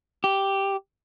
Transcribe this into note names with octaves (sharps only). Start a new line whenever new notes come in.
G4